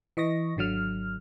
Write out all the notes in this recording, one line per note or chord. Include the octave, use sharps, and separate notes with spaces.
E3 D#5 C#6 A#6
G#1 D3 F#3 F6